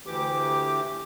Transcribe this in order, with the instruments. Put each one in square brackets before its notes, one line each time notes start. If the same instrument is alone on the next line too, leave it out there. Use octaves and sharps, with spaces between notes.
[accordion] D2 E3 G4 D6